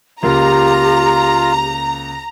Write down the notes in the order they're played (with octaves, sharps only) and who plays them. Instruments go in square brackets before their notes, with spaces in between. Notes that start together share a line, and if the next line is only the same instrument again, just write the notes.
[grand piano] C#2 A#3 F5 [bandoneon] F4 [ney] G4 [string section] A#5